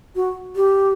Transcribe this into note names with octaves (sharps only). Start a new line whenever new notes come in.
F#4
G4